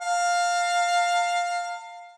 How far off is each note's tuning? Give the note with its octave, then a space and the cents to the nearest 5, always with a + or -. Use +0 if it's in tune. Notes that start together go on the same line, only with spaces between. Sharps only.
F5 +10 A5 +45